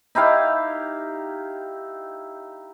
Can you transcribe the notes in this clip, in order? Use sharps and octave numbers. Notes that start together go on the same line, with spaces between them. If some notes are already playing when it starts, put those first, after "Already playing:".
D#4 E4 G4 F5